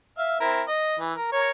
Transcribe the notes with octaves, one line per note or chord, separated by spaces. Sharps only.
E5 F5
C4 E4 A#4
D#5
E3
A#4
A#4 C#5